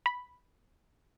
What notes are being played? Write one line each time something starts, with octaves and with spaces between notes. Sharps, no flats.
B5